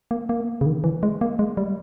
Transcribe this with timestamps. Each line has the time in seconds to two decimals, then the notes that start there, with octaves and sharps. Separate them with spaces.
0.11 A#3
0.29 A#3
0.61 C#3
0.66 D#3
0.84 E3
1.03 G#3
1.21 A#3
1.39 G#3
1.57 G3